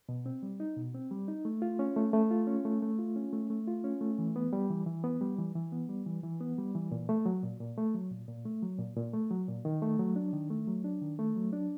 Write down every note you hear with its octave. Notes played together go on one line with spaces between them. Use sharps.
B2
C4
G3
D#4
B2
C4
G3
D#4
A3
F4
C#4
A3
A3
F4
C#4
A3
A3
F4
C#4
A3
A3
F4
C#4
A3
E3
B3
G3
E3
E3
B3
G3
E3
E3
B3
G3
E3
E3
B3
G3
E3
A#2
A3
F#3
A#2
A#2
A3
F#3
A#2
A#2
A3
F#3
A#2
A#2
A3
F#3
A#2
D#3
A3
F#3
D4
D#3
A3
F#3
D4
D#3
A3
F#3
D4